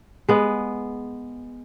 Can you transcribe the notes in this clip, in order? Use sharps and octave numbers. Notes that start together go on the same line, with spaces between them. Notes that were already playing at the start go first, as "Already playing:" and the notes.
G#3 B3